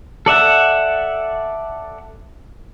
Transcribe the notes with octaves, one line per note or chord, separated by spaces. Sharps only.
A4 D5 E5 F#5